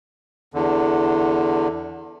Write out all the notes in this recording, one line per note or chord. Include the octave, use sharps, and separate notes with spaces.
E2 D3